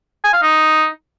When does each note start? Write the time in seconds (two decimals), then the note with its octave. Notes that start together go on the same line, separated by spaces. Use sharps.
0.24 G#5
0.33 F5
0.42 D#4